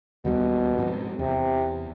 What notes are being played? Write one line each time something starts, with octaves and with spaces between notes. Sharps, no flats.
D#2 B2 G3 B3
G#2 F3 C4
E2 C3